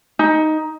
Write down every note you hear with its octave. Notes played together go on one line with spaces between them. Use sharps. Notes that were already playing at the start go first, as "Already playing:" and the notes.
D#4